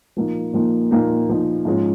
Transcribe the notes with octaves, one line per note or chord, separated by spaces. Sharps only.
A#2 F3 A#3 D#4
A#2 F3 A#3 D#4
A#2 F3 A#3 D#4
A#2 F3 A#3 D#4
G#2 F3 G#3 C#4 F4